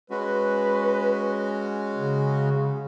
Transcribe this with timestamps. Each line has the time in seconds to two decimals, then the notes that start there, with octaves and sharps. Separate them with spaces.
0.10 G#3 C#4 F#4 B4
1.95 C#3